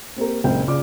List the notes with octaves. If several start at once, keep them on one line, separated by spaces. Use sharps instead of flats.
A#3 C4 G4 A#4
F#1 C#2 A#2 A#3 C4 G5
C#3 F4 D5 D6